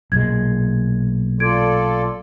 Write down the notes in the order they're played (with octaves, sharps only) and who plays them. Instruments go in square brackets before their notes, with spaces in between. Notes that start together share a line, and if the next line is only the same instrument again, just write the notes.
[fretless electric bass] B1 A#2 G#3 [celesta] G#6
[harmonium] F4 A4 D5 [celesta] G#6 D7